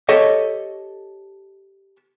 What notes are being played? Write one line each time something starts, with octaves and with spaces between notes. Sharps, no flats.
G4 A4 C#5 D#5